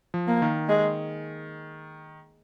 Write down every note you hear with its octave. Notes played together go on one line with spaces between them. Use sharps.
F3
A#3
D#3
G#3